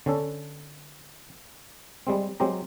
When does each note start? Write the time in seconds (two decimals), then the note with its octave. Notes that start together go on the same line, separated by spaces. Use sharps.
0.06 D3 C#4 A4
2.07 G3 G#3 C4
2.40 F#3 G#3 C4 G4 A#5